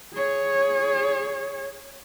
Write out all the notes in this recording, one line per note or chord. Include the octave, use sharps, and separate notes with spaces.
G#4 C#5